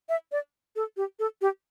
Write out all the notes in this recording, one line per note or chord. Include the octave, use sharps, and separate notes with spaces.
E5
D5
A4
G4
A4
G4